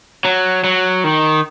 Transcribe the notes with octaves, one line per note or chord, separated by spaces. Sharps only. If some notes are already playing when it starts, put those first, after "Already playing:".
F#3
F#3
D#3